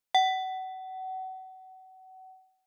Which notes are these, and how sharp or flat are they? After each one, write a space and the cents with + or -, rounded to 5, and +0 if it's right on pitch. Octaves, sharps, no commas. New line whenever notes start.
F#5 +30